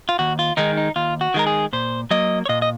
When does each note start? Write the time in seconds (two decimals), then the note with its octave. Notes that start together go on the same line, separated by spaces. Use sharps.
0.09 F4
0.19 D#2 F#4
0.39 F4
0.57 D#3 G#3 D#4
0.77 D#4
0.96 D#2 F4
1.21 F#4
1.34 D#3 G#3 A#4
1.47 G#4
1.73 A#2 C5
2.11 F#3 A#3 D#5
2.46 C#5
2.49 A#2 D#5
2.62 D#5